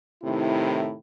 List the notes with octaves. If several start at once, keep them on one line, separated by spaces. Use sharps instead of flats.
A2 C3 D#3 E4